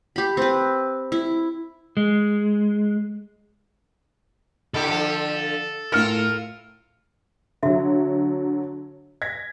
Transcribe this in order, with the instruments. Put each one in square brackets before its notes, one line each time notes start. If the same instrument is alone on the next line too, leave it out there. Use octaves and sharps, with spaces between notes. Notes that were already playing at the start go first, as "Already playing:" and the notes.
[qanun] G4 B5
C4 B4
E4
[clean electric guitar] G#3
[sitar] D3 E4 G4 [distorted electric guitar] A4
[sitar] D3 F3
[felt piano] A2 F6 C#7 [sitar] F4 A#4
[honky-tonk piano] D3 F#3 [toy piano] F#4 E5
[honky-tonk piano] G#6 A#6 B6